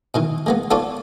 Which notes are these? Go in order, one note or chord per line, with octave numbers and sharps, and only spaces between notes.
B2 D#3 E3
G#3 A#3 B3
B3 F4 A4 C#5 D5 F5